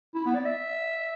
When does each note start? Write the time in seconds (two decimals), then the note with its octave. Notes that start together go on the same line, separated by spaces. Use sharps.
0.14 E4
0.25 B3
0.35 D5
0.45 E5